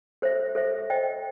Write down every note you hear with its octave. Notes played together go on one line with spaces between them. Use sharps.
A4 C5 E5
A4 C5 E5
C5 D#5 G5